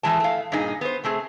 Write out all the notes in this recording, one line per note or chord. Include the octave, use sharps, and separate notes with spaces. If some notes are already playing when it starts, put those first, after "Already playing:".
A2 E3 G#3 A5
A3 F5
G2 A#2 D#4 G#4
B3 C5
C3 A3 C4 G#4